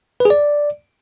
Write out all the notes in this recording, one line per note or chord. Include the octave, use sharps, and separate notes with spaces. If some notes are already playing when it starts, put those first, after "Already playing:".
B4
G#4
D5